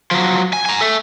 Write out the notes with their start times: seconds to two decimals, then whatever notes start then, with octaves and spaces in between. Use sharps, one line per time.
0.11 F3 F#3
0.53 G#5
0.66 G#5 A#5
0.81 A4 E5